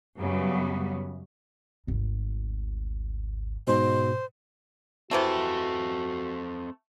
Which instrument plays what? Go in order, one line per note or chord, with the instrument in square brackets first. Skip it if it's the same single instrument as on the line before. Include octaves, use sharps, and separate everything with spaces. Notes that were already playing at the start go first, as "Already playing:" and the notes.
[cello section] F#2 C#3 F#3 G3 B3
[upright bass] G#1 D2
[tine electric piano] G#2 B2 [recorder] C5
[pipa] C3 E3 A3 [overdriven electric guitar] C4 A4 [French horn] F#4